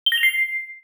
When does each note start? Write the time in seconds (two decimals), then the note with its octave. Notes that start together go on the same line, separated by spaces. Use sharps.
0.06 G7
0.12 A#6
0.18 F7
0.23 C7